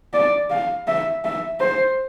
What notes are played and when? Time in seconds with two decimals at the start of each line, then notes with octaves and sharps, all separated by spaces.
0.13 D5
0.50 F5
0.88 E5
1.25 E5
1.60 C5